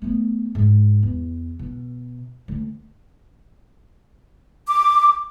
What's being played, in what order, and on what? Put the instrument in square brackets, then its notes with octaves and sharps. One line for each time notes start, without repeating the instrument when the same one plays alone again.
[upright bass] A3 B3
G#2
E2
B2
D2
[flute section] D6